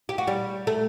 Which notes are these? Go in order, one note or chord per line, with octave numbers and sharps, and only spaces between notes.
G4
F#4
G3
A3